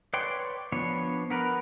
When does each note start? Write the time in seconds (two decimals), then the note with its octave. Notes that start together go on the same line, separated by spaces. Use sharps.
0.14 B4 C#5 D5 G5 C6
0.72 F3 B3 D4 C#5
1.30 B3 A#4 B4